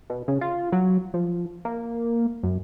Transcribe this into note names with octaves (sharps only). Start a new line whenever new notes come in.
B2
C#3
F4
F#3
F3
A#3
F#2